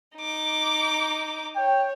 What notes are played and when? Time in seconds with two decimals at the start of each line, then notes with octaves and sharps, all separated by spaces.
0.17 D#4 D6
1.56 C#5 G5